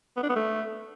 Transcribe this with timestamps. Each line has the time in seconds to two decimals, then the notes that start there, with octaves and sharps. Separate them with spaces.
0.16 B3
0.23 D4
0.29 B3
0.36 A3